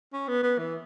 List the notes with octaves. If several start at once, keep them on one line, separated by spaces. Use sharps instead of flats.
C#4
B3
B3
E3